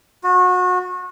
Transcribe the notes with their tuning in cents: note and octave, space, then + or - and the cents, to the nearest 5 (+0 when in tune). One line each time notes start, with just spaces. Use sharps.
F#4 -30